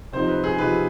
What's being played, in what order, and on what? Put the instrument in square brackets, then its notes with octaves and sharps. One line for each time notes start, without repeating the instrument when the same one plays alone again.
[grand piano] C3 F3 C4 D#4 C5
B4
G#4
C3 F3 C4 D#4 B4